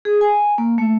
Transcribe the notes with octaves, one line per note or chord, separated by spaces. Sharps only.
G#4
G#5
A#3
A3